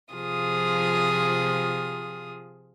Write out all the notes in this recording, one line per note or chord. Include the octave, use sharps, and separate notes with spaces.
C3 F3 F4 G#4 D#6